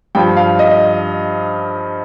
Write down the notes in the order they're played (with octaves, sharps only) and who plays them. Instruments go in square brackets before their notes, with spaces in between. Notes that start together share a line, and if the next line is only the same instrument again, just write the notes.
[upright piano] G2 F3 G5
F5
D#5